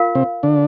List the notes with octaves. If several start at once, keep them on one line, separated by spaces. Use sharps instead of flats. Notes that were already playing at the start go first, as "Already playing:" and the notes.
Already playing: F4 A#4 F5
C3 C4
D3 D4